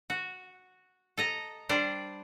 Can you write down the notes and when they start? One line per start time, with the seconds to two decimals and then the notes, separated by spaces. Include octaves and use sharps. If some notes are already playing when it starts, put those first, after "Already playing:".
0.10 F#4
1.17 A4 D#5 A#5
1.69 G3 D4 C5